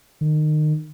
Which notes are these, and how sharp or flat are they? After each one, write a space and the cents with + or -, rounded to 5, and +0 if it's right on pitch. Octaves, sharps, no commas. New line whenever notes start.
D#3 -30